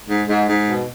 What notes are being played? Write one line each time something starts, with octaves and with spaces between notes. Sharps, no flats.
G#2
G#2
G#2
B2